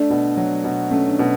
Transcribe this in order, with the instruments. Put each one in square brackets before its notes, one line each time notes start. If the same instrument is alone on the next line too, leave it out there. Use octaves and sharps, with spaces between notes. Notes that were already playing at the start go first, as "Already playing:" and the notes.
Already playing: [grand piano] A3 [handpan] D4
[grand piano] B2
F#3
B2
[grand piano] A3 [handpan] C#4
[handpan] D4
[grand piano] B2